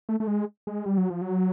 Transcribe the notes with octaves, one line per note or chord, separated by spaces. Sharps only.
A3
A3
G#3
G#3
G3
F#3
F3
F#3